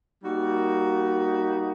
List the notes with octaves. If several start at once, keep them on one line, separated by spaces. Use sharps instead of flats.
G3 A#3 D#4 F#4